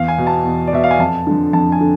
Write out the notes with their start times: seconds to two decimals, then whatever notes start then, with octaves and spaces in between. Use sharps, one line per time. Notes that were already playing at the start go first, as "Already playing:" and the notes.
Already playing: E2 F5
0.08 G#5
0.18 B2
0.27 A5
0.44 E2
0.67 D5
0.73 B2 E5
0.84 F5
0.91 G#5
0.99 F2 A5
1.27 D3 F3
1.53 F2 A5
1.72 G#5
1.81 D3